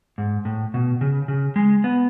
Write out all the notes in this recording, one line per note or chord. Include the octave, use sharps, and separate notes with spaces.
G#2
A2
B2
C#3
C#3
G#3
B3